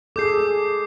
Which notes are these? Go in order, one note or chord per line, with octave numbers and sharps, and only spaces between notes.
G#4 A4 D6 G6 C7